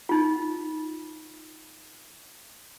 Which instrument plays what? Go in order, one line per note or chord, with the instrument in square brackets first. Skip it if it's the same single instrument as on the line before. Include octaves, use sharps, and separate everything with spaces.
[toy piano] D#4 F4